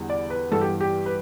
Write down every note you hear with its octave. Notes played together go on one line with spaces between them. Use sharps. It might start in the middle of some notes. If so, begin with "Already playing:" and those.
Already playing: E2 D3 G3
D5
B4
G2 E3 B3 A4
G4
G4
B4